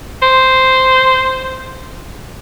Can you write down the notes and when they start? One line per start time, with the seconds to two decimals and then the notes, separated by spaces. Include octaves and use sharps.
0.22 C5